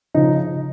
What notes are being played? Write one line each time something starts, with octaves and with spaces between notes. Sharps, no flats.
C#3 F3 D#4